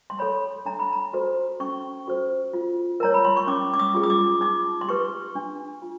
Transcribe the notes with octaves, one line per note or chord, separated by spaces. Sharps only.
C6
A4 C#5 B5
D4 A#5
B5
A#5
F#4 A4 C5 C6
C#4 C#6
F#4 A4 C5
F4
A#4 C#5 A#5
B5
C6
C#6
C#4 D6
D6
D#6
F4 G#4
D#6
D6
D#4 D6
C6
G4 B4 C#6
D4
F4